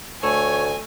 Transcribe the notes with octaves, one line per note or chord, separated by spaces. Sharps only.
D2 A3 C#5 G#5